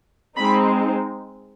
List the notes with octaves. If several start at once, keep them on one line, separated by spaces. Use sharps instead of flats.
G#3 C4 D#4 B5